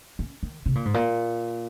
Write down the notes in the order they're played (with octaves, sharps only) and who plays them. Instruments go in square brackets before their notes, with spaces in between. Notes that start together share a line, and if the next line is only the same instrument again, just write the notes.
[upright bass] C#4
D#3
C3
A#2
G#2
A#2